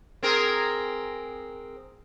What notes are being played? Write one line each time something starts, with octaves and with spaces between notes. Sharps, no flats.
C4 G#4 A#4